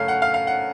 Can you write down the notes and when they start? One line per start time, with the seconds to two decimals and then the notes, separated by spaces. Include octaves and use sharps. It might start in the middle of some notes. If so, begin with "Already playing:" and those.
Already playing: F#2 C#3 A3 C#4 F5
0.08 F#5
0.22 F5
0.34 F5
0.47 F#5